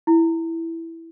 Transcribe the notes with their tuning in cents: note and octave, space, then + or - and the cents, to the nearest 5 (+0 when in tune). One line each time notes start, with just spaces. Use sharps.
E4 +0